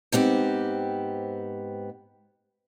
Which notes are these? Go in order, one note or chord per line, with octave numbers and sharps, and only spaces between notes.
G#2 B3 C4 G4